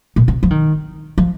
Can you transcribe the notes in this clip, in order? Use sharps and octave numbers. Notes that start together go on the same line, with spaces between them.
A#2
C3
F3
D#3
F3